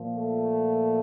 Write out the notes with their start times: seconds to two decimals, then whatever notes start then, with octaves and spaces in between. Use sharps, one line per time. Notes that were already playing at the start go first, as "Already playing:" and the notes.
Already playing: A#2 F3
0.15 A3